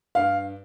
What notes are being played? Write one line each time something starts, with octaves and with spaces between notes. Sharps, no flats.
G2 F5